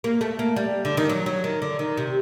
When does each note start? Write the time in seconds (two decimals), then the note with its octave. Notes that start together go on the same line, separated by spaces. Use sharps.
0.04 A#3
0.21 A3
0.39 A#3
0.56 G3
0.85 D3
0.97 D#3
1.09 F#3
1.26 F#3
1.44 D#3
1.62 D3
1.79 D#3
1.97 C3